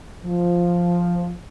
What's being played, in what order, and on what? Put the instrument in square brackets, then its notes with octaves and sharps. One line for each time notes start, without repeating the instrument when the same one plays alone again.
[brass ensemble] F3